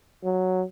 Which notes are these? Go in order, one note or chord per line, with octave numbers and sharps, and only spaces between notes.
F#3